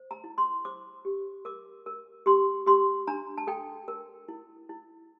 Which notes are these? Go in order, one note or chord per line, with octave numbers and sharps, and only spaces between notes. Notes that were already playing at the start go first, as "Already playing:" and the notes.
Already playing: C5
A#5
E4
C6
C5 D6
G4
A#4 D6
A#4
G4 C6
G4 C6
D4 A#5
A5
A4 G5
A#4
E4
E4